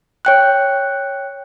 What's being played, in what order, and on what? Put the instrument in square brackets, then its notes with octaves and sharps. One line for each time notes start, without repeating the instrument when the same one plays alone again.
[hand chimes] C#5 G5 F#6